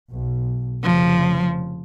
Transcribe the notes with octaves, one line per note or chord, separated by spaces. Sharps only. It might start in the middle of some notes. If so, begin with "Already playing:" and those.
B1
F1 C#3 F3